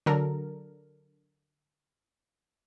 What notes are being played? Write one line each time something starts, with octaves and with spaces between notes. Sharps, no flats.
D3 F#3 A4 A#4